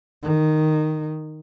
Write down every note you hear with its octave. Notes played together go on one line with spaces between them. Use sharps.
D#3